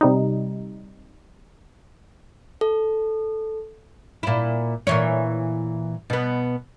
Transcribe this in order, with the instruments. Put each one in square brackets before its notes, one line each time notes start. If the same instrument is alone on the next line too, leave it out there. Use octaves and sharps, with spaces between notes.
[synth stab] C3 G3 D#4
[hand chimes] A4
[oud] A#2 E4
A#2 E3 C#5
B2 B3